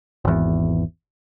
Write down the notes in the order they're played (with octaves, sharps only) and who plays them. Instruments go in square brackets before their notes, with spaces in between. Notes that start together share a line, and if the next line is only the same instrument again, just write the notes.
[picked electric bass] G#1 E2